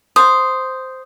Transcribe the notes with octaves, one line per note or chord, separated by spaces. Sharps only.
C5 D#6